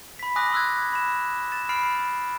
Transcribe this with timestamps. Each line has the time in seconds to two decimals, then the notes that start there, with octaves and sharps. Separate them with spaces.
0.19 B5 B6
0.36 G#5 D6 D#6 F#6 A#6
0.52 C6 E6 F#6 G#6
0.93 B5 E7
1.52 A6 E7
1.69 B5 F6 C7 D7